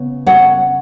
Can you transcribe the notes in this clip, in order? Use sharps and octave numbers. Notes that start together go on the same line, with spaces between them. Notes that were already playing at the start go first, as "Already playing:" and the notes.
Already playing: C#3 B3
C#5 F#5